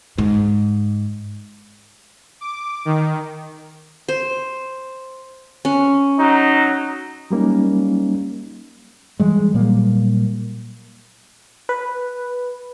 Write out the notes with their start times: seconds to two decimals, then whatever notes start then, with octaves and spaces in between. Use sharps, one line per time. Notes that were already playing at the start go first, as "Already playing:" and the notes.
0.18 G#2
2.41 D6
2.85 D#3
4.09 C5
5.65 C#4
6.19 F#3 D#4
7.31 F#3 G3 A#3 C#4 D#4
9.20 E3 G3 G#3
9.54 A#2 F#3 G3 A#3
11.69 B4